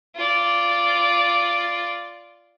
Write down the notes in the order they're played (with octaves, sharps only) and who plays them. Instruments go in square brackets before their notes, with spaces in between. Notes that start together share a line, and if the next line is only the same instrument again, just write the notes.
[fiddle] F4 D5